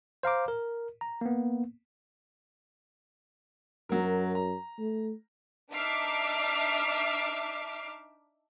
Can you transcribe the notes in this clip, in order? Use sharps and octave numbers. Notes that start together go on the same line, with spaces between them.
C5 F5 A#5 D6
A#4
A#5
A#3 B3
F#2 F#3 A#4
A#5
A3
D4 D#4 E5 D6 F6 C7